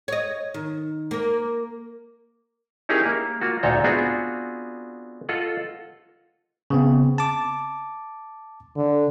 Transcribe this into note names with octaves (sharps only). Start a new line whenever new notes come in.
C#5 D#5
D#3
A#3 A#4
C#4 D#4 E4 G4 G#4 A#4
A#3
A#3 F4 F#4
D2 A#2 D#4 A4 C#5 A#5
B3 C4 D4 F4 F#4 G#4
F4 A4 D#5 F#5
C#3 B3 C4
A5 D6
D3